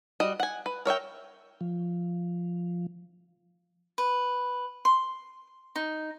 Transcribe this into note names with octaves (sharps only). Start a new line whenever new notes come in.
G3 F#4 D#5
F#5 G#5
B4
A#4 C#5 E5 G5
F3
B4
C6
D#4